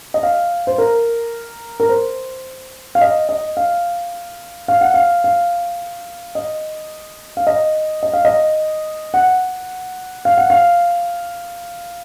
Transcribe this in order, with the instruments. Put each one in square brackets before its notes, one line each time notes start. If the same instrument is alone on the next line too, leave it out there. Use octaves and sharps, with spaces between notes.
[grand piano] D#5
F5
C5
A#4
A#4
C5
F5
D#5
D#5
F5
F5
F#5
F5
F5
D#5
F5
D#5
D#5
F5
D#5
F#5
F5
F#5
F5